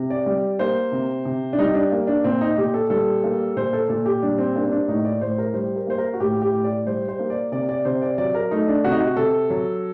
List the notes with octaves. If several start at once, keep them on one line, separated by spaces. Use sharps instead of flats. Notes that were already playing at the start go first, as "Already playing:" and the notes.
Already playing: C3
D5
G3 D5
A#3 C5
C3
C3
D4
G3 D#4
D4
A#3
D4
A#2 C4
D#4
A#2 G4
A4
G3 A4
A#3
A#2 C5
A4
A#2 A4
G4
G3 D4
C4
A#3 D4
C4
D4
A2 D#4
D5
A2 C5
A#4
G3 C5
A#4
A#3 C5
A#4
F#4
A2 G4
G4
A2
D5
G3 C5
C5
A#3
D5
C3 D5
D5
C3 C5
D5
F#3 D5
A#4
A3 D#4
D4
C3 F#4
D#4
F#4
C3 A4
F#3